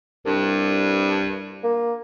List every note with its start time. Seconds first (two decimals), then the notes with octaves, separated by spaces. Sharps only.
0.25 C2 G2
1.64 A#3